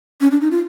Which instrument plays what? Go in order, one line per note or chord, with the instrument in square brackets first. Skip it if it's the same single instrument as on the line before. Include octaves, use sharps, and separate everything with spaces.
[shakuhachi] C#4
D4
D#4
F4